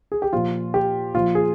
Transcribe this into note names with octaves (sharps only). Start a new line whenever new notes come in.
G#4
G4
A#2 F3 F4
G4
A#2 F3 F4
G#4